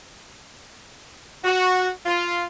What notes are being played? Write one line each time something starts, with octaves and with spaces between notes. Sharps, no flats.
F#4
F4